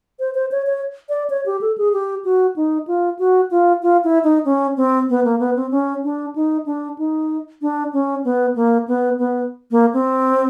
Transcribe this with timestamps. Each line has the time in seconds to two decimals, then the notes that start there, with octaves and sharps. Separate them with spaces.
0.20 C5
0.35 C5
0.52 C#5
0.66 C#5
1.09 D5
1.30 C#5
1.46 G4
1.61 A4
1.78 G#4
1.93 G4
2.25 F#4
2.56 D#4
2.87 F4
3.19 F#4
3.51 F4
3.83 F4
4.04 E4
4.24 D#4
4.45 C#4
4.77 C4
5.09 B3
5.25 A#3
5.40 B3
5.56 C4
5.71 C#4
6.04 D4
6.36 D#4
6.66 D4
6.98 D#4
7.62 D4
7.93 C#4
8.24 B3
8.56 A#3
8.88 B3
9.19 B3
9.71 A#3
9.93 C4